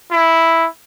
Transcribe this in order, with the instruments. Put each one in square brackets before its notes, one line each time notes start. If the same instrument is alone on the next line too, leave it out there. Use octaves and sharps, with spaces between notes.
[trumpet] E4